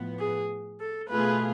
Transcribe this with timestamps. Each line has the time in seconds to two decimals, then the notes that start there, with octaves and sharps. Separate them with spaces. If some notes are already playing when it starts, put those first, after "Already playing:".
Already playing: A2 F3 B3
0.19 G#4
0.80 A4
1.10 B2 A3 F4 G#4 B4